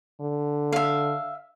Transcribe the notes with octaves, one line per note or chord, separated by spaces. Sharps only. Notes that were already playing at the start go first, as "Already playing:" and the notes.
D3
E5 F5